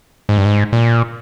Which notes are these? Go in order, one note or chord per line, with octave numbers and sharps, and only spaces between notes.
G#2
G2
G#2
A#2